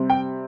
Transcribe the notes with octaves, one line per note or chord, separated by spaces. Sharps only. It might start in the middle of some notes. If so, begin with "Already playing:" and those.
Already playing: C3 G3 C4
G5